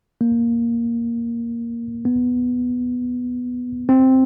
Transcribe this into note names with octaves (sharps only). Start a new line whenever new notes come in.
A#3
B3
C4